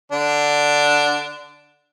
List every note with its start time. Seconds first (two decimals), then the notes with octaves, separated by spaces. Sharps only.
0.12 D3 D4